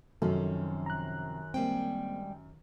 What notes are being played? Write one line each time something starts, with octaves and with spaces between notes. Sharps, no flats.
F#2 C3 D#3 F3 C#4 A4
A#5 F#6
G3 G#3 A#3 C4 G5